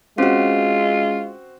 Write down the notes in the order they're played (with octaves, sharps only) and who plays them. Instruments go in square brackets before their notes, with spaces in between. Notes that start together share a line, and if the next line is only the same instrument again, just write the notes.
[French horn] G#3 [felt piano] C4 F#4 [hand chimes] C#4 [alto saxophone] F4